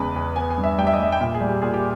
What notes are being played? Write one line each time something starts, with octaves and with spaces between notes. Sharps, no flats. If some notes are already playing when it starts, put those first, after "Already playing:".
Already playing: E2 C#3 G#3 B4
E2
B3 G#5
G#5
G2
E5
G3 G5
E5
D#5
G3 E5
G5
A#2 E5
G#4
G3
G4
A#2 G#4
G4